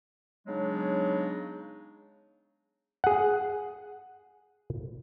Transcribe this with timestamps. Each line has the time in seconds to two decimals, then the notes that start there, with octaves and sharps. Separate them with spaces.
0.47 C#3 F#3 G#3 B3 D4 D#4
3.04 G#4 F#5